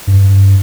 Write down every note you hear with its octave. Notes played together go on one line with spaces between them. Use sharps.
G2